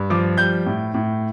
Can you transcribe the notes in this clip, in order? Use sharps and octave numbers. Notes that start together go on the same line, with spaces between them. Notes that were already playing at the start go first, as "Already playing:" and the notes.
Already playing: G2
F3 D6
G3 G6
A2
A2